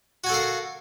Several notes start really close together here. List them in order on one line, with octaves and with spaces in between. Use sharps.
F#4 G#5 A4 A#4 F5